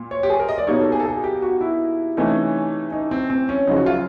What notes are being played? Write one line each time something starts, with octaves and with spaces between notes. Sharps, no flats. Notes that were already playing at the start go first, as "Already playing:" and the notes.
Already playing: A#2
C#5
G4
G#4
A#4
D#5
D5
B2 G3 A#3 D#4 C#5
A4
G#4
A4
G#4
G4
F#4
E4
C3 E3 A3 C#4 D#4
D#4
C4
C4
C#4
F#2 C#3 F3 D#4
F#4
F4